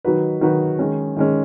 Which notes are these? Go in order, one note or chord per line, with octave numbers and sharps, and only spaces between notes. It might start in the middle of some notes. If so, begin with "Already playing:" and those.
D#3 F#3 D#4 F#4 B4
D#3 F#3 D#4 F#4 B4
D#3 G#3 C#4
D#3 G#3 C#4